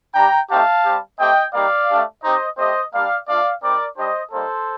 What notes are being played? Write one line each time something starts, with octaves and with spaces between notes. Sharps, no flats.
G3 D4 G4 G5 A#5
A3 C4 D#4 G4 F5 A5
G3 C4 G4
A3 C4 G4 D#5 G5
G3 A#3 D#4 G4 D5 F5
A3 D4 G4
C4 D#4 G4 C5 D#5
A3 C4 G4 C5 D#5
G3 A#3 D4 G4 D5 F5
A3 D4 F4 D5 F5
G3 C4 D#4 A#4 D5
G3 D4 G4 C5 D#5
G3 A#3 D#4 A4 C5